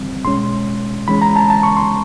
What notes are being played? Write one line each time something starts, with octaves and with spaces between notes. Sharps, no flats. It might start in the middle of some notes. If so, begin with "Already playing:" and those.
Already playing: E3 G3 C4
B2 G#3 C#4 C6
E3 G#3 C#4 B5
A#5
A5
A5
C#6
C6